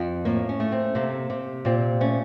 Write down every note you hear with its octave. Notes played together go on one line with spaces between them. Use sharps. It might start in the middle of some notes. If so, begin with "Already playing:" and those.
Already playing: F2
A2 A#3
C#4
A3
C4
C3 A#3
C3
A#2 C4
A3 C#4